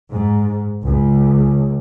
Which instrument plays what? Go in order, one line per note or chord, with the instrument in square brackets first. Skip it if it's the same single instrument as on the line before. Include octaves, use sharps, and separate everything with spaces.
[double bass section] G#2
C#2